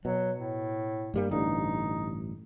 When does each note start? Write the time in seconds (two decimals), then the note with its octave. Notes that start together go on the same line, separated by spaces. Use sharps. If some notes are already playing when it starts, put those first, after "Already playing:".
0.05 B2 F#3
0.37 A2
1.14 G2 G3 A#3
1.31 A1 G2 D3 D#4